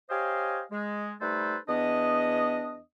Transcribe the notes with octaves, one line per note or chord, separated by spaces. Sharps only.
G4 C5 C#5 D#5 F5 G#5
G#3
G3 A3 D#4 A4 B4 C5
E2 B3 D4 D#5